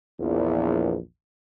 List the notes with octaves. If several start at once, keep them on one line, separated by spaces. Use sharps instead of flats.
A#1 E2